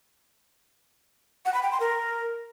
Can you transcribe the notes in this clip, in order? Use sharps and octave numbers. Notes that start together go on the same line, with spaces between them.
F#5
B5
G5
C6
A#4